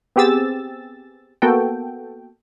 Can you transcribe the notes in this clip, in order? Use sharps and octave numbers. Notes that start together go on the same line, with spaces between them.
B3 C4 G4 G#4 E6 A6
A#3 B3 F#4 A4 G5